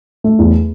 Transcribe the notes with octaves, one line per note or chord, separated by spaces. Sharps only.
A3
E2